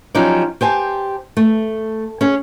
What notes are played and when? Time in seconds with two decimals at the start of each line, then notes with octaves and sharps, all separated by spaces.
0.15 F3 F#3 C#4 D#4 G4 D5
0.61 G4 C5 G#5 A5
1.37 A3
2.21 C#4 G#4